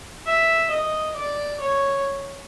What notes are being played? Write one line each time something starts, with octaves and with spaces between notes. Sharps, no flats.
E5
D#5
D5
C#5